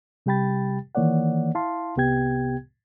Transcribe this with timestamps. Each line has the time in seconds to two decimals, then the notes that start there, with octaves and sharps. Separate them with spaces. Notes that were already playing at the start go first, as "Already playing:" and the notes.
0.26 C3 G3 G4 G5 B5 A6
0.95 D#3 E3 A#3 C#5 D5 F#5
1.55 E4 F5 A5 C6
1.96 C2 C3 B3 G4 G5 G#6